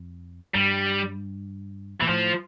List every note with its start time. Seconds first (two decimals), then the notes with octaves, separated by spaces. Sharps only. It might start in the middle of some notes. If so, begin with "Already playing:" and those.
Already playing: F2
0.55 G2 G3
2.00 A#2 E3
2.08 A2 F3